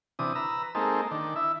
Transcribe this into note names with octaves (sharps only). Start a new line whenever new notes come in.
C3 E3 D4 D#6
B4 A#5 E6
G#3 A#3 C4 D#4 A4
D#3 D4
E4 E5